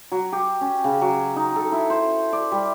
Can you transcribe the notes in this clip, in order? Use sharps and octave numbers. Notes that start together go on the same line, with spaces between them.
F#3
G4
C#4
C#3
F#3
D#4
A4
E4
C5
D5
G3